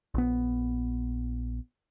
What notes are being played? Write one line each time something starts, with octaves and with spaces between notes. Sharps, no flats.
A#1 B3